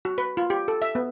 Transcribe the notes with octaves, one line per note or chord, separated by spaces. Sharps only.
F#4
B4
F4
G4
A4
E5
B3